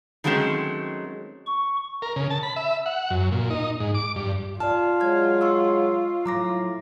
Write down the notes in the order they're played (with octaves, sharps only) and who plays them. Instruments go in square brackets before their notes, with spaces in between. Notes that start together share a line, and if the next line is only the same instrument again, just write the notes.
[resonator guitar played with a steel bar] D#3 F#3 G#3 A3 C4 C#4
[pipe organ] C#6
[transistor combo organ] A#4
C#3
A5
B5
E5
F#5
F#2
A#2
D#4
G#2
D6
G2
[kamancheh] F4 [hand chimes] D5 F6 [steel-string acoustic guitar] A5
[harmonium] F#3 G#3 [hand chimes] F6 G#6
[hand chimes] C6 C#6 E6
[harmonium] A2 [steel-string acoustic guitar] F#3 [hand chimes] A#5 D6 A#6